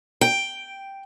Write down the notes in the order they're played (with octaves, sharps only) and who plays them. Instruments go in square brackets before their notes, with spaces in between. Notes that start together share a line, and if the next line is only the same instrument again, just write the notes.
[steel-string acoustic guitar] G5